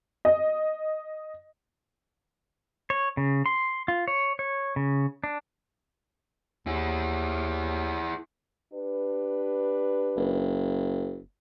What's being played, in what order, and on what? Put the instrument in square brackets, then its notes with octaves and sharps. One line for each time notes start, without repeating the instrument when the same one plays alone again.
[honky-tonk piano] D#5
[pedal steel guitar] C#5
C#3
C6
F4
C#5
C#5
C#3
D4
[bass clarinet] D#2 [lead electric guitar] E4 G#4
[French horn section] D4 G4 B4
[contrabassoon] F#1